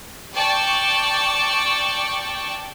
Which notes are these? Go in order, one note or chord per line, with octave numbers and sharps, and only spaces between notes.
D5 G5 A5 C#6